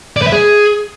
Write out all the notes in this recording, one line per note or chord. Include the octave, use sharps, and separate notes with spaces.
D5
B4
E5
G#4